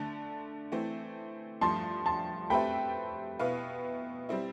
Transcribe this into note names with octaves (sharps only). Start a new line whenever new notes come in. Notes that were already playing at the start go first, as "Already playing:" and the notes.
Already playing: D3 A3 D4 A5
E3 A3 C4
G2 F3 A3 A5 C6
A5 C6
A3 C4 G4 B4 E5 G5 B5
B2 B3 E4 B4 F5
G3 C4 E4